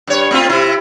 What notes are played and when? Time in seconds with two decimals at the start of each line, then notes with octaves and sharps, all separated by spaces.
0.07 G2 C#5
0.31 A3 C4 F4
0.49 C3 E4